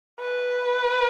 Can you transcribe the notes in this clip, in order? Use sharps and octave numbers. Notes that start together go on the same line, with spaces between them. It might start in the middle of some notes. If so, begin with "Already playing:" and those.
B4